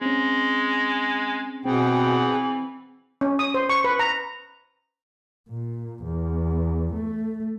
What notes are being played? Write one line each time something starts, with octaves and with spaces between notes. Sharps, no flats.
G#3 C4 C#4
B2 E3 C4 G#4 F#5 G5
C#4
D#6
C5
C#6
B4
A#5
A#2
E2
A3